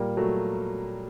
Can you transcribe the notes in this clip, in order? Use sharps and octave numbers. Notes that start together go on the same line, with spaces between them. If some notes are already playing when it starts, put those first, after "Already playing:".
Already playing: A#2 G3 A#3
F#3 A3